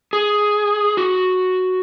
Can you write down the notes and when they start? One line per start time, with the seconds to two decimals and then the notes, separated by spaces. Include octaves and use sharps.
0.13 G#4
0.97 F#4